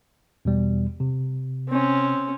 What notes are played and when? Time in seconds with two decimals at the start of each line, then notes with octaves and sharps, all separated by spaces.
0.45 E2 B2 G3
1.00 C3
1.69 C4 C#4